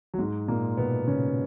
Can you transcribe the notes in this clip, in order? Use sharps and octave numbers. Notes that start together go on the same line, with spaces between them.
F#3
G#2 G#3
A#2 A#3
B2 B3
C#3 C#4